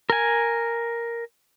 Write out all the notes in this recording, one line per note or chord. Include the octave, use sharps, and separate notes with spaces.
A#4 G#5